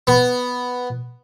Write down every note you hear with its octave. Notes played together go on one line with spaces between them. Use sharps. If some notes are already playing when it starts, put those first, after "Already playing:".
B3